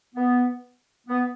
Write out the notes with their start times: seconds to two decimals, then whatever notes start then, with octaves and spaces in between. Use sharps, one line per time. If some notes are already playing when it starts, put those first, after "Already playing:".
0.15 B3
1.07 B3